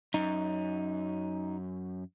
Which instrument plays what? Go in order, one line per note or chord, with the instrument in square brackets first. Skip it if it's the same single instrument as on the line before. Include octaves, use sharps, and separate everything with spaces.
[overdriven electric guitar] F#2 [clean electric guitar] D#4